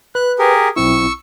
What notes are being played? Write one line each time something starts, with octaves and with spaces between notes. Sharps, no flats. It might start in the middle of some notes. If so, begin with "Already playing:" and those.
B4 F#6
G4 G#4 A#4
B1 C4 E4 C#6 E6